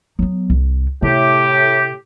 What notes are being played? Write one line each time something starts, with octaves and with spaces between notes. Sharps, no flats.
F#3 B3
C2
A2 C3 G4